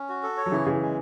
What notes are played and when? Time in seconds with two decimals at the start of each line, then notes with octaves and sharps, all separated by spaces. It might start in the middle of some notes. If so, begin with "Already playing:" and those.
Already playing: C#4
0.09 F#4
0.23 A4
0.37 C#5
0.46 F#3
0.52 C#3 E3 E4
0.66 C#3 E3 G#3
0.81 G#3